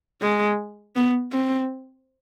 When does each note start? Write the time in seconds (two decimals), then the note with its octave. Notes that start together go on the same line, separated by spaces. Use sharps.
0.22 G#3
0.96 B3
1.32 C4